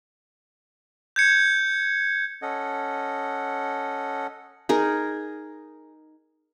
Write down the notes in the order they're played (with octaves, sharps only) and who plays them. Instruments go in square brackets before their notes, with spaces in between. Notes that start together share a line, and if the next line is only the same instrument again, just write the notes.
[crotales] G6 G#6 C#7
[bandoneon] C#4 A4 D#5 F#5
[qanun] D#4 G#4 A#4